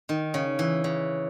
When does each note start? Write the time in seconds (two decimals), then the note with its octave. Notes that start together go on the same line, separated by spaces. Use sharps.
0.09 D#3
0.34 C#3
0.59 E3
0.84 C#3